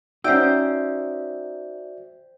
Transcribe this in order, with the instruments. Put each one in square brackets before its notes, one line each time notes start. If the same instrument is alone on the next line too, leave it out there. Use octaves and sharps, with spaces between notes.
[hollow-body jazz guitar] C#4 D#4 [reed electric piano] F#4 D5 E5 [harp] C5 G5 [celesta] E6